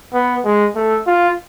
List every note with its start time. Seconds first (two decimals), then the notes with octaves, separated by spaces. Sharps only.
0.13 B3
0.45 G#3
0.76 A3
1.07 F4